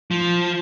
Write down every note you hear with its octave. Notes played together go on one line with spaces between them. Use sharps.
F3